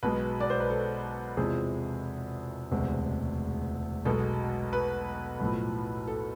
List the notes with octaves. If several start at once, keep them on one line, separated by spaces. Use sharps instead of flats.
B1 B2 G#3 B4
D5
C5
B4
A4
E2 C3 F3 G#3 G#4
E1 D2 C3 G#3
B1 B2 G#3 A4
B4
B1 A2 F3
A4